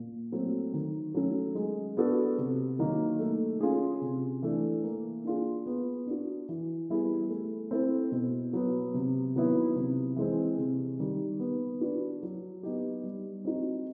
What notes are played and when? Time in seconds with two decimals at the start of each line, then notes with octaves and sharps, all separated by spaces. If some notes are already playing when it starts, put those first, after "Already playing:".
Already playing: A#2
0.32 F#3 A3 C4
0.74 D#3
1.14 F#3 A3 C#4
1.55 G#3
1.97 B3 D4 F#4 A4
2.38 C3
2.79 D#3 F#3 A#3 D#4
3.19 A3
3.61 C#4 F4 G#4
4.01 C3
4.42 E3 A3 D4
4.83 A#3
5.24 D4 F4 G#4
5.66 B3
6.07 D4 F#4
6.49 E3
6.89 G3 B3 E4 G#4
7.30 A3
7.71 C4 E4 A4 C5
8.12 B2
8.53 F#3 B3
8.94 C3
9.36 D#3 F#3 B3 E4
9.76 C3
10.16 E3 G#3 C4
10.58 C3
10.99 D#3 G3
11.40 B3
11.81 D4 F#4 B4
12.23 F#3
12.63 B3 D#4 G4
13.04 G3
13.45 C4 D#4 F#4